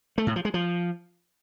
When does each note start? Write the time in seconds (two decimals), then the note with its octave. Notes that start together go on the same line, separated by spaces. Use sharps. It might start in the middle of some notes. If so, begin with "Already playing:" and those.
0.18 A3
0.27 A2
0.36 F3
0.45 G#3
0.54 F3